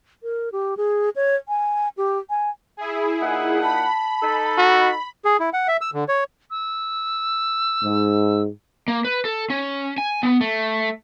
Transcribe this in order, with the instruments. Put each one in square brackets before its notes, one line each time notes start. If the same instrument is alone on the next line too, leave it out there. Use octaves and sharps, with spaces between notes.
[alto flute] A#4
G4
G#4
C#5
G#5
G4
G#5
[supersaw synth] E4 G#4
[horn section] A#2 D#4 F#5
[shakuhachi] A5 [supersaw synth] B5
[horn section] D#4 A4
[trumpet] F#4
[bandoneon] G#4
E4
F#5
E5
E6
D3
C#5
[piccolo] E6
[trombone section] G#2
[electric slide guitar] A#3
B4
A4
C#4
G#5
B3
A3